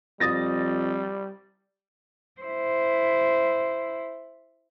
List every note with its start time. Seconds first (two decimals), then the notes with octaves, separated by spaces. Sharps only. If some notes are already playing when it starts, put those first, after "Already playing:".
0.20 F2 G3 D#6 A6 A#6
2.41 E4 C5